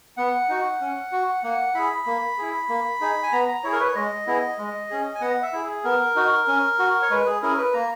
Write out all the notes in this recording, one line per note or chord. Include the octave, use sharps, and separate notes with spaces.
B3 F#5
D#4 F#4
C#4
F#4
A#3 F#5
E4 G#4 B5
A#3
E4 G#4
A#3
D#4 G#4
G#5
B3 A#5
A#5
E4 G#4 C#5
A#4
B4
C#5
G#3 D#5
B3 E4 G#4
G#3
C#4 G#4
G#5
B3 F#5
E5
E4 G#4
G#4
B3 A#4
D#4 F#4
C#4
F#4
C#5
G#3 B4
G#4
C#4 E4 G#4 A#4
B4
A#3 A#5